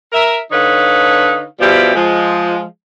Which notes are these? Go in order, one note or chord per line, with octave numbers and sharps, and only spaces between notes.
A#4 E5
D3 D#4 B4 C#5 F5
B2 F3 G3 E4 G4
F3 G#3